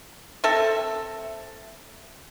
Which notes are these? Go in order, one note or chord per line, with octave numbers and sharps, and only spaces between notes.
C4 A4 E5